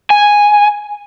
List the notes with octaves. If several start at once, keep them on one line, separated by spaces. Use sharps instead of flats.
G#5